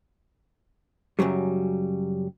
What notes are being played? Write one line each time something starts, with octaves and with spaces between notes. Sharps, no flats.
F#2 A2 C#3 F#3 G3